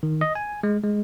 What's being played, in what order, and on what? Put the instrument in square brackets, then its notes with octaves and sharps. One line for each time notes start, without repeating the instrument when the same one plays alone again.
[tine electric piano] D#3
D#5
G#5
G#3
G#3